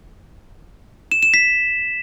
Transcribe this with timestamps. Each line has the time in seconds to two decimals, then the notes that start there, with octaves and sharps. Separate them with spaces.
1.12 E7
1.23 E7
1.34 B6